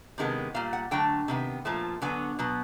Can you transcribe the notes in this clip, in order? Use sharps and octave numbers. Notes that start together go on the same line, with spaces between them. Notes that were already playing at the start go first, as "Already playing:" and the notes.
C3 D#3 G#3 B3
A#2 G3 A#3 F5
F#5
D3 F#3 A3 G5
C3 D#3 B3
A#2 F3 A3
D3 F#3 B3 G#5
B2 F#3 B3